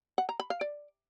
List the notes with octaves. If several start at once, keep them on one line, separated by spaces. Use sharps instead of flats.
F#5
A#5
B5
F5
D5